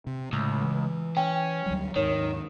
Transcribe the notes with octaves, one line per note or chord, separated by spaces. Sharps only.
C3
C#2 A2
E3
C#4 G5
D2 F#3 G3
D#2 G#2 D#3 C#5